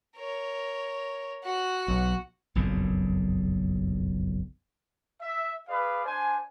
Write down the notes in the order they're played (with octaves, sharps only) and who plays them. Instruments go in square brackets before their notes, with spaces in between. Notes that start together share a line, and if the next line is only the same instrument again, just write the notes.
[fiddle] A#4 C#5
F#4 F#5
[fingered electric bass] B1
[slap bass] F#1 B1 F2 A#2
[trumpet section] E5
G#4 B4 D5 F5
D4 C5 G#5